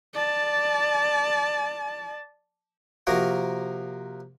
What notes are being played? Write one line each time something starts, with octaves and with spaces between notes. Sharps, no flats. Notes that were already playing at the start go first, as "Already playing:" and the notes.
D5 A5
C3 F3 A#3 F#4 A#4